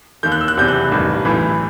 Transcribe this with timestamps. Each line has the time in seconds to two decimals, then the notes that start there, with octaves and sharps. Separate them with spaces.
0.23 D#2 D#3 G6
0.32 F#6
0.41 E6
0.48 F#6
0.57 F#1 E2 C3 G6
0.68 F#6
0.91 A1 G2 D#3
1.25 B1 A2 E3